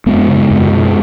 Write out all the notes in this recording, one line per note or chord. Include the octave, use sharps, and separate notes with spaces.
F#2 G#3 B3
C#3
F#2
B2